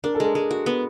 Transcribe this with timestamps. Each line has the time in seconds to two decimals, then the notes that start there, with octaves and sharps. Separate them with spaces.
0.04 D4 A#4
0.15 A4
0.20 G#3 A#4
0.35 G#3
0.51 F#4
0.66 B3